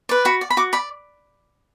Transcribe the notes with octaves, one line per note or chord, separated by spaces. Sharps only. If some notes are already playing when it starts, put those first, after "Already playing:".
B4 D5
F#4 B5
D5
B5
F#4 D6
D5 B5